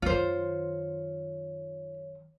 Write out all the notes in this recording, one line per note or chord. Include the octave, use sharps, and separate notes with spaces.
F#2 D#3 F4 C5 C#5